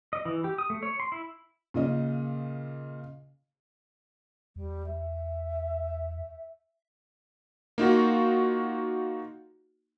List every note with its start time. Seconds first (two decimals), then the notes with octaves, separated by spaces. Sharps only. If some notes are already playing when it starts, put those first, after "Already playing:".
0.13 D#5
0.25 E3
0.44 G4
0.58 D#6
0.70 A3
0.83 C#5
1.00 C6
1.12 E4
1.74 A#2 C#3 D#5
4.56 E2 G3
4.86 E5
7.78 A#3 D#4 F4 F#4